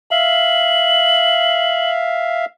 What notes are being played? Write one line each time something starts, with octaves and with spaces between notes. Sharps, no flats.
E5 F5 F#7